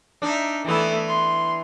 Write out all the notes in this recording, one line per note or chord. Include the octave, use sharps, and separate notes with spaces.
D4 D#4 E5
E3 A3 B3 E4
C6